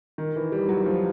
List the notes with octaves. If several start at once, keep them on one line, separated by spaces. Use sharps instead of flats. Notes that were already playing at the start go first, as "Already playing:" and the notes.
D#3
E3
G3
F#3
F3